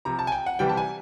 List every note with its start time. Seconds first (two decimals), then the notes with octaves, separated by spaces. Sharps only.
0.05 C3 F3 A#5
0.19 A5
0.27 G#5
0.32 G5
0.46 F#5
0.59 C3 E3 G3 G5
0.69 A5
0.77 G#5